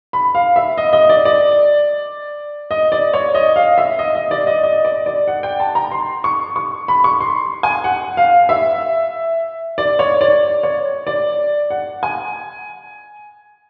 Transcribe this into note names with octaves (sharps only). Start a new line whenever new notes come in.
B5
F5
E5
D#5
D#5
D5
D5
D#5
D5
C#5
D#5
F5
E5
D#5
D#5
D5
D#5
D#5
D5
D5
F#5
G5
A5
A#5
C6
C#6
C#6
B5
C#6
C6
G#5
F#5
F5
E5
D5
C#5
D5
C#5
D5
F#5
G#5